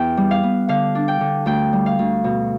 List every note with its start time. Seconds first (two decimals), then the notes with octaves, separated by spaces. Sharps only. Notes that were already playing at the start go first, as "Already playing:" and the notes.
Already playing: E2 G5
0.17 G3
0.31 F5
0.43 B3
0.69 D3 F5
0.95 D4
1.08 G5
1.21 D3
1.46 D2 G5
1.73 G3
1.86 F5
1.99 D2
2.24 B2